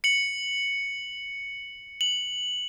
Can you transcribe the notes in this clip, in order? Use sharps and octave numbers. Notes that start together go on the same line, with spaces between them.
C#7 F#7
F#7